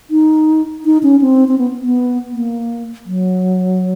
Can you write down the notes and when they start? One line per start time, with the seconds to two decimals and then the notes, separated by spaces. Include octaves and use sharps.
0.11 D#4
0.85 D#4
1.03 C#4
1.22 C4
1.48 C4
1.58 B3
1.83 B3
2.32 A#3
3.06 F#3